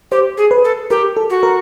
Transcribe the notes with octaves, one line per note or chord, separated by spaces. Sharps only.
G4 C5
G#4
B4
A4
G4 A#4
A4
F#4
A#4